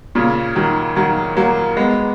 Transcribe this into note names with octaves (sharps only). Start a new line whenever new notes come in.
A#2 C#3
D#3 F#3
D#3 F#3
F#3 A#3
G#3 B3